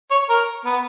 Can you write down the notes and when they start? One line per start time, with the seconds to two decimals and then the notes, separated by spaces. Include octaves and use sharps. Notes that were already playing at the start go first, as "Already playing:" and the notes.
0.11 C#5
0.29 A#4
0.65 B3